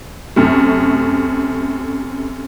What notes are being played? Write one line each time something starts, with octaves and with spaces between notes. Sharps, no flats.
F#2 C3 A3